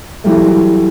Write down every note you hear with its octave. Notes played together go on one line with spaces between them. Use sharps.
E3 F#3 G3 A3